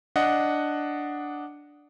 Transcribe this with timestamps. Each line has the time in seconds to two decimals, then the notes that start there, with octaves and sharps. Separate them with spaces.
0.16 D4 D#5 F#5